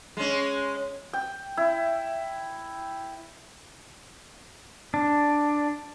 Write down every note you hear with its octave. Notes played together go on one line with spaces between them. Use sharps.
G#3 C#4
G5
E4
D4